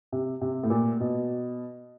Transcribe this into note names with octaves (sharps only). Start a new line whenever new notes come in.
C3
C3
A2
A#2
B2